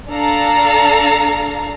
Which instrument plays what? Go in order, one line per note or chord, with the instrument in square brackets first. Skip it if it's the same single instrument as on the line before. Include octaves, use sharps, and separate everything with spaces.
[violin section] D4 A4 F5 A#5